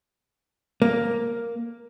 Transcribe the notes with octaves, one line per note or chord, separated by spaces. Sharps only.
A#3